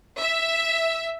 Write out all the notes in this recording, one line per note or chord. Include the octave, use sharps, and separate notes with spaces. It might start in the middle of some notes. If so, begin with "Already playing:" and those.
E5